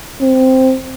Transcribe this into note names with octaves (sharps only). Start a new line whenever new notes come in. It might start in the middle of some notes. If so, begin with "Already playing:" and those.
C4